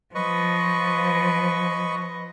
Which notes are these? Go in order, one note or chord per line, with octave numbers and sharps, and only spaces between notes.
F3 B4 D#5 C#6